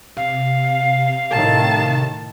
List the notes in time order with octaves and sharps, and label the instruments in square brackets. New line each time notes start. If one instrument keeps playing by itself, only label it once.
[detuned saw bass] C3 [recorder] F5
[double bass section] A2 D#3 [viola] A5